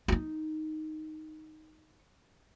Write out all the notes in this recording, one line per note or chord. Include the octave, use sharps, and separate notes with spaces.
D#4 F4